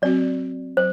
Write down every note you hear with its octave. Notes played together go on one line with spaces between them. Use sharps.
F#3 C4 F#4 D5
F#3 C5